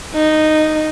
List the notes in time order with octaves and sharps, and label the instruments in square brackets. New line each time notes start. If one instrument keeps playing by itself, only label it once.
[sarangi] D#4